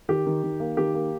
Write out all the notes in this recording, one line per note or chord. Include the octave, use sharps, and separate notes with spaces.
D#3 G4
D#3
D#3
A#3
D#3 G4
A#3